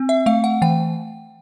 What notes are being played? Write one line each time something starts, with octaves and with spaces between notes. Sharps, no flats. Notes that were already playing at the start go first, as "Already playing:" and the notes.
Already playing: C4
E5
A3 F5
F#5
E3 G5